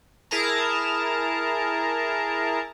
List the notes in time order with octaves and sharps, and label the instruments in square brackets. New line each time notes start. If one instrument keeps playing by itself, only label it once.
[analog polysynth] E4 G#4 A#4 A5 A#5